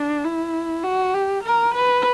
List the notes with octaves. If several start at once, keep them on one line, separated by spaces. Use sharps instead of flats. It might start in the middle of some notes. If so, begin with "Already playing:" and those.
Already playing: D4
E4
F#4
G4
A#4
B4